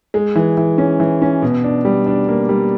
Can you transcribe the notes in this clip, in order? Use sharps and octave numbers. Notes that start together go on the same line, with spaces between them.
G#3
E3
E3
C#4
E3
C#4
B2
D4
G3
D4
A#3
G3